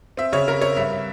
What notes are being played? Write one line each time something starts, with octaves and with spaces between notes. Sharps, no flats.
C4 E5
C#3 C#5
C#3 A#4
C4 C#5
G2 E5